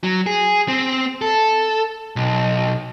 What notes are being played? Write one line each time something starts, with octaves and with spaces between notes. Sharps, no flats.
F#3
G#4
C4
A4
B1